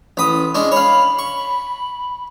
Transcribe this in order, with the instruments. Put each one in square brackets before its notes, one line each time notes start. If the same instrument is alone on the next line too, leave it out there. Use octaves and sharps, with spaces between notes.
[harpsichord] A1 B5 D#6
G#3 C#4 D4
[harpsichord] C#5 F5 [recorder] B5
[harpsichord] C#6